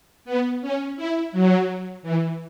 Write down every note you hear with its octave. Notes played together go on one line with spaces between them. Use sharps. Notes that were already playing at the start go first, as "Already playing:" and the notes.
B3
C#4
E4
F#3
E3